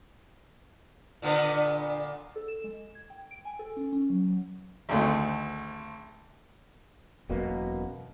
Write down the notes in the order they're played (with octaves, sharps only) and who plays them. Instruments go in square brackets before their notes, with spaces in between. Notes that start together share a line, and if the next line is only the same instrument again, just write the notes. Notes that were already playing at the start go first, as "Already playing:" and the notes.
[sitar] A#2 D3 B3
[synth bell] A4
E7
G#3
G#6
G5
D7
G#5
A4
C#4
C#4
F#3
F#3
[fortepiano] G#1 D2 A3
[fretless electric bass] E1 F#2 B2 A#3